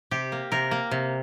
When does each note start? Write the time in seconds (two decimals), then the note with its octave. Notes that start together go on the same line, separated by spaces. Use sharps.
0.11 C3 G4
0.32 A#3
0.52 C3 A#4
0.71 A#3
0.91 C3